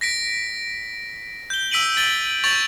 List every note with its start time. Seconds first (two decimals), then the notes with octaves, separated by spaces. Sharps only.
0.01 A#6 B6 D7
1.50 G6 G7
1.70 E6 B6 D7 D#7 F#7 G7
1.97 E6 A6 D#7 G7
2.44 C#6 G6 A6 D7 F7 F#7